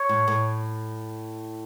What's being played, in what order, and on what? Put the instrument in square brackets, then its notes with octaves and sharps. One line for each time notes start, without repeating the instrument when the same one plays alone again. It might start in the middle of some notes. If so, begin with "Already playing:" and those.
Already playing: [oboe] C#5
[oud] A2
A2